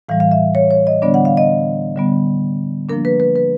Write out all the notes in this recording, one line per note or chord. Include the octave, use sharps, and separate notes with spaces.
A2 E3 G3 F5
F5
E5
C#5
C#5
D#5
D3 G3 B3 D4 D5
F#5
F5
D#5
D3 G3 B3
F3 A#3 D4 A#4
B4
B4
B4